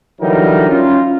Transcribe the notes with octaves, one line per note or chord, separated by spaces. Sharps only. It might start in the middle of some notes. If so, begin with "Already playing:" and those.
D3 E3 F#3 G3 D#4 A#4
C#4 F4